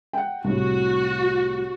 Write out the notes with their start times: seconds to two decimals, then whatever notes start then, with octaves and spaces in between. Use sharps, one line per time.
0.13 F#5 G5
0.44 C2 A2 F#4